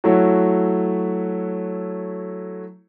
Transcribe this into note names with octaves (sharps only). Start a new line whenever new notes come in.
F#3 A3 E4 F#4 C#5